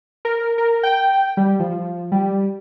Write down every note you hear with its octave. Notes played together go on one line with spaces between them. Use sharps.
A#4
A#4
G5
G3
F3
G3